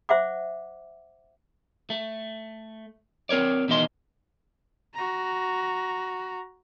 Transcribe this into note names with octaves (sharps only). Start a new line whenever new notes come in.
C5 E5 F#5 D6
A3
C4 A#4 C#5 D5
E2 B2 D#3 D#5 C6
F#4 A#5